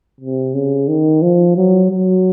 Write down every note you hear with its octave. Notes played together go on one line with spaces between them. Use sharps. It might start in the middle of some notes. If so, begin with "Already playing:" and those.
C3
C#3
D#3
F3
F#3
F#3